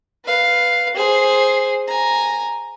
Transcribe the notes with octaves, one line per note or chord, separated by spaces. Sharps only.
B4 F5
G#4 C5
G#5 A#5